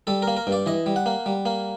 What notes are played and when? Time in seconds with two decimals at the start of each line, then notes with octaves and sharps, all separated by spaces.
0.07 G3 A4
0.22 A#4
0.27 A#3
0.37 A#4
0.47 G2
0.52 D5
0.66 E3 D#5
0.86 G3
0.96 F#5
1.06 A#3
1.26 G3
1.46 A#3